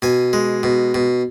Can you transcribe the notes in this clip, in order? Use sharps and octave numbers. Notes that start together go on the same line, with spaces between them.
B2 G#5
G#3
B2
B2